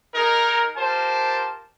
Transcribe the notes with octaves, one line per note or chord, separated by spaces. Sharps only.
D#4 G#4 A#4
F4 G4 A#4 C5 A5